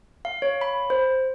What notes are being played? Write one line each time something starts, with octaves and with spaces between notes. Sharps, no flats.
F5
C#5
B5
C5